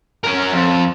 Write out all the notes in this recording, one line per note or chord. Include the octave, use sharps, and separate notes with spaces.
C#4 A#4
F2